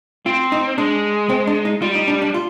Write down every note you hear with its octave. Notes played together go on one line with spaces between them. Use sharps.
C4 F4
D#4
G#3 D4
C4
D4
D#4
G3 F4
D#4
D4
D4
F4